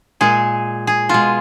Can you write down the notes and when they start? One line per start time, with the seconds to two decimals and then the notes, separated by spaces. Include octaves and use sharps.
0.21 A#2 G#3 G#4
0.87 G#4
1.09 B2 G#3 F4